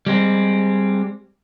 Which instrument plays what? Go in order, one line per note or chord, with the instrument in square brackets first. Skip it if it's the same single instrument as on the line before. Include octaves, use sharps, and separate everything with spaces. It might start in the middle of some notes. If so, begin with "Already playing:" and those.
[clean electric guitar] G3 G#3 C4